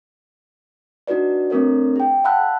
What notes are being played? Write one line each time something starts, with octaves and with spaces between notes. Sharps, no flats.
D4 D#4 F#4 B4 D5
A3 C4 D4 A#4 C#5
G#4 G5
F5 F#5 A5 B5 E6 F#6